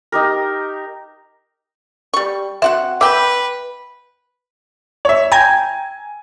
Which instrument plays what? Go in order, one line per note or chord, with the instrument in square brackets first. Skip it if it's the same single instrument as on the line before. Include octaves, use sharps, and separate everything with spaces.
[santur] D#4 G4 A#4
[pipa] G3 C#6
[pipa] C4 F#4 F#5 [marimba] E5
[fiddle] B4 [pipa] E5 G5 [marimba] D6
[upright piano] C#5 E5
[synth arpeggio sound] G5 A#5 G#6 [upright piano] G#5